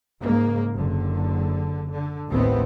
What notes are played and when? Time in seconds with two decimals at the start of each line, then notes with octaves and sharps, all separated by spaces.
0.20 G#2 C#3 A#3
0.74 F#1 D3
1.90 D3
2.29 A1 D#2 A2 B3 C4